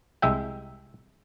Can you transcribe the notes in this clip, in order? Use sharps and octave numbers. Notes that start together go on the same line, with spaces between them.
C2 G#3 E5 G5